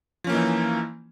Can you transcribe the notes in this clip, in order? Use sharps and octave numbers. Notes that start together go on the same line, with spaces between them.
E3 F3 A#3 C#4 D#4